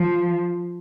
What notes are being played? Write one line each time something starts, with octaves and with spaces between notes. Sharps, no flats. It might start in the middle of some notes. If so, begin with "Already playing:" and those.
Already playing: F3